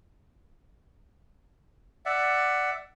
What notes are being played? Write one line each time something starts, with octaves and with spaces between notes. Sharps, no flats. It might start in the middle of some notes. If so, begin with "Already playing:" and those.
D5 E5 F#5